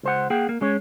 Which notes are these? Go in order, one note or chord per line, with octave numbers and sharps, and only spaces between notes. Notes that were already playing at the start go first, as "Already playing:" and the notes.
C#2 C5 F#5
A#3 G#4 F#5 G5
A#3
G#3 C#4 C#5